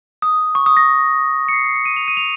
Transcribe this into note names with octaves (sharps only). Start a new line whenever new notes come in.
D#6
C#6
D#6
A#6
C#7
C7
C7
C#7
D#7
F7
D#7
F7